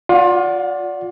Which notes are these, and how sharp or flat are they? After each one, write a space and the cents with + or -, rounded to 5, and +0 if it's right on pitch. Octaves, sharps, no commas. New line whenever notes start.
F4 +30 D5 -20 F#5 -5